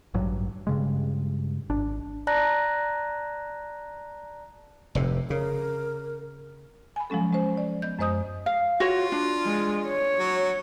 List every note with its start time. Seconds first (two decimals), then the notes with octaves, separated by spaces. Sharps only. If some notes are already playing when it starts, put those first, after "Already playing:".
0.14 A1 G2 F#3
0.67 G2 C#3 G#3
1.70 G#1 D4
2.27 D5 A5 A#5 F#6 A#6
4.95 F1 A2 C3
5.30 C#3 A#4
6.96 G#5 B5
7.10 F3 F#3 G#3 C#4 A4
7.33 G#3 C#4 C5
7.57 D5
7.82 B3 D#5 G6
7.99 F#2 G#3 C5 D#5 D#6 G6
8.46 F5
8.80 F4 F#4 C#5
9.12 D4
9.45 G#3
9.88 C#5
10.19 F#3